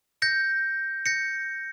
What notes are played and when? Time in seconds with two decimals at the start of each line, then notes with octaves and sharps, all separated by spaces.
0.22 G6 A#6 C#7
1.06 G6 A#6 C#7